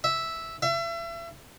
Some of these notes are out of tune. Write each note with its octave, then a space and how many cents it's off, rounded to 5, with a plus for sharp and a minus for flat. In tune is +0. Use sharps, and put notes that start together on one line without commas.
E5 -5
E5 +35